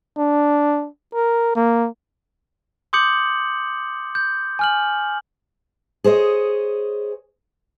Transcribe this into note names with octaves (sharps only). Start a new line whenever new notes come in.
D4
A#4
A#3
C6 D6 D#6 G6 C#7 F#7
G6
G#5 F6 F#7
G#4 C5 C#5 D#5